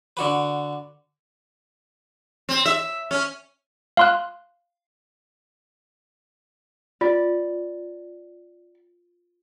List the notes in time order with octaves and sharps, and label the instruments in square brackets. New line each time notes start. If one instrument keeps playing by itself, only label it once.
[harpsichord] D3 F#4 B4
[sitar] C4
E5
C#4
[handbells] F5 C6 F#6
[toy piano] F4 [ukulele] D5